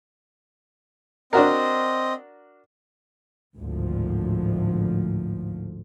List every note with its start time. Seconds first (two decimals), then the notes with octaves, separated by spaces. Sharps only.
1.33 C4 D4 F#4 A#4 D#5
3.58 G#1 D2 A2 F3